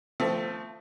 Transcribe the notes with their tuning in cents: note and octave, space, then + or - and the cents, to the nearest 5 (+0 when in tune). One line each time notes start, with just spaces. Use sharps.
F3 +0 A3 +15 C4 -15